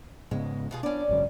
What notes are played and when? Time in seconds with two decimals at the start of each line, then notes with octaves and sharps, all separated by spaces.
0.31 G#2 C#3 G#3 B3
0.71 B2 F4 G#4
0.83 B3 C#4 D4 D5
1.09 G#1 F#2 C#3